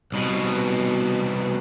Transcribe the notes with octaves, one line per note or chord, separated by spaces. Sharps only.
C2 B2